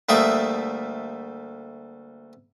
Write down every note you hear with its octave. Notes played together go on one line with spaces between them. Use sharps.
D2 G3 A3 A#3 E5 D#6